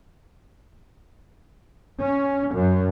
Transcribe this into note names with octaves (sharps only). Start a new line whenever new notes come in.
C#4
F#2